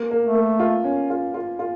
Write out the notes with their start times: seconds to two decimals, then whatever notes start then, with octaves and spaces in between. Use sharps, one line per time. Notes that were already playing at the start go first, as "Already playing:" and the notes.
Already playing: A#3
0.11 A#3
0.23 A3
0.35 A#3
0.60 F4
0.84 C#4
1.10 F4
1.34 F4
1.59 F4